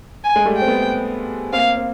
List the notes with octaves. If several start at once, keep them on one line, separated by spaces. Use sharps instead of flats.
G#5
G#3
G3 A3
G5
C4
A3 B3
A#3 C4 F5
C4